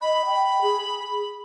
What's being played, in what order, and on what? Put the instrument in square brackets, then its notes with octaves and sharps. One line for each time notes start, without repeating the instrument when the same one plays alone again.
[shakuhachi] D#5 [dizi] B5
[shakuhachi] G5
G#4